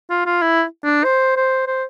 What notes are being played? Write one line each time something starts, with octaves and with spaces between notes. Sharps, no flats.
F4
F4
E4
D4
C5
C5
C5